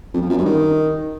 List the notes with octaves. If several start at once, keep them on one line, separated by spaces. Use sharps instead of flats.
F2
F3
F#2
G2
D#3